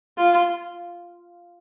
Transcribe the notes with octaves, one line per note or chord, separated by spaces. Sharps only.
F4